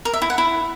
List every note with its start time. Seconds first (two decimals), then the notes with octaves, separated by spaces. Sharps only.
0.05 A#4
0.13 E5
0.22 E4
0.30 F#5
0.38 E4